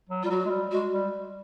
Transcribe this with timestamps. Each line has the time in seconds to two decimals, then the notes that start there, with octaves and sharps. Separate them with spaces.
0.09 F#3
0.23 G3 F4
0.30 F#3 F#4
0.45 G#3
0.51 G3
0.71 G#3 F#4
0.92 G3